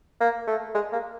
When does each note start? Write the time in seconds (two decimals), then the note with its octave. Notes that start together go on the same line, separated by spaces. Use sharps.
0.20 A#3
0.47 A3
0.74 G#3
0.92 A#3